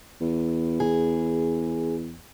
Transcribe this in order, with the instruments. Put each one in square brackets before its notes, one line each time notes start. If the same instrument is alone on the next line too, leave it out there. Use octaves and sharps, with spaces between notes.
[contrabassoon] E2
[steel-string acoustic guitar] G#4